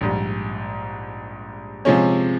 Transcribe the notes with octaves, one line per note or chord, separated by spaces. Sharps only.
A#1 G#2 G3
C3 F3 G#3 C#4